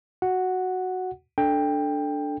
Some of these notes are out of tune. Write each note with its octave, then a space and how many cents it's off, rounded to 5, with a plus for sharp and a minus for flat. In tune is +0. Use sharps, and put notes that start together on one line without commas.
F#4 +0 F#5 +0
D4 +0 A4 +0 G5 +15